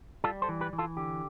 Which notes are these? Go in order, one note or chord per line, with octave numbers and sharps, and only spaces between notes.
G3 F4 A4
A4 C5
E3
G4 B4
E3
F4 A4
D3 G4